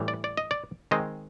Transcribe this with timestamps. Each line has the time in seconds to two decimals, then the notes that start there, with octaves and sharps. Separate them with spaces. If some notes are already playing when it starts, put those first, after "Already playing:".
Already playing: A2 E3 G3
0.08 D5
0.24 D5
0.37 D#5
0.51 D5
0.91 D#3 G#3 C4 D#5